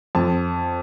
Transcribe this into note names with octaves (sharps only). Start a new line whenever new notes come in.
F2 A5